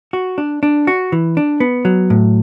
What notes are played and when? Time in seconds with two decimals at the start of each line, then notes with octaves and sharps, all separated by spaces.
0.13 F#4
0.38 D4
0.63 D4
0.87 F#4
1.12 E3
1.37 D4
1.60 B3
1.85 F#3
2.10 A2